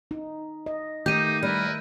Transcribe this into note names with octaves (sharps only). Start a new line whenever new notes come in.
D#4
D#5
D#3 A3 A#3 D#4 G4 G6 D#7
G3 E4 A#4 B4